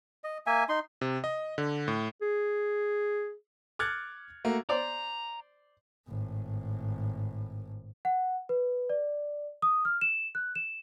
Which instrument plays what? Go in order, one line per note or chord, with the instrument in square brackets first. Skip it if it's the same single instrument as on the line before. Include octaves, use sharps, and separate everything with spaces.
[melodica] D#5
A#3 E5 G#5
D#4 C6
[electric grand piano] C3
D#5
D3
A2
[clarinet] G#4
[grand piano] D6 F6 F#6 G#6 A6 C#7
A3 A#3 F#4
[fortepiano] C5 D5 [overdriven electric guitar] A#5
[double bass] G#1 A2
[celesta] F#5
B4
D5
D#6
F6
E7
F#6
E7